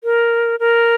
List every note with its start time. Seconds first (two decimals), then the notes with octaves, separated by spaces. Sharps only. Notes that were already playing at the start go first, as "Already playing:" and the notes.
0.04 A#4
0.60 A#4